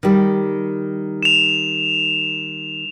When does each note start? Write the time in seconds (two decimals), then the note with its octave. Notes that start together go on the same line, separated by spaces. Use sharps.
0.03 D#3 G3
1.23 E7 F7